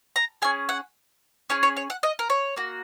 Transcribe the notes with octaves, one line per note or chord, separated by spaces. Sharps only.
A#5
C#4 G#4 G#5
F#5
C#4 G#4 C#5
C#5
C#5
F#5
D#5
A#4
C#5
A#3 F#4